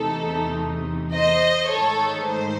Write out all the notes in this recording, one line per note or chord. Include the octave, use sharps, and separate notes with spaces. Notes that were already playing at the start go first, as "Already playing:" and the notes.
Already playing: E2 C3 E3 A3 D#4 A4
C5 D#5
G#2 D#3 A3 D#4 A4 C#5
C5